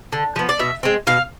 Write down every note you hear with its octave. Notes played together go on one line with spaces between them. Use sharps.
D3
F3 B3
D5
B2 E5
G#3 C4
B2 F5